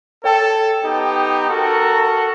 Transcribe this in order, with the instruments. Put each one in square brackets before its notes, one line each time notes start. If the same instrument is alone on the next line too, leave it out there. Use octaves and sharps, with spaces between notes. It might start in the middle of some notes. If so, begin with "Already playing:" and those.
[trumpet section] A4 [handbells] C#5 G5 A5
[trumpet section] B3 D#4 G4
F#4 A4 A#4